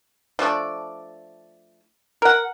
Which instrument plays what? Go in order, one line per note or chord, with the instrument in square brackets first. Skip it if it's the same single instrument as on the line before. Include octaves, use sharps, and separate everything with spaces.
[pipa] F3 A3 D4 D5
A#4 F#5